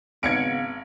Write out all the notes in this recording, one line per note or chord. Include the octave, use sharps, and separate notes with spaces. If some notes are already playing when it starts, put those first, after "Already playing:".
G#1 C#3 B3 F5 G#6 C#7 D7